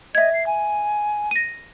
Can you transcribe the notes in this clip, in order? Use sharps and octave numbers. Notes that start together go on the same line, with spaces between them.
D#5 E5 G#6
C7
G#5
A#6 D#7